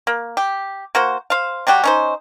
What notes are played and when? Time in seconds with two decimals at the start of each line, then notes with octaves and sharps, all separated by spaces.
0.07 A#3
0.37 G4
0.95 A#3 F#4 C5
1.30 C5 F5
1.67 F#3 G3 F#4 G4
1.84 C#4 D#4 C5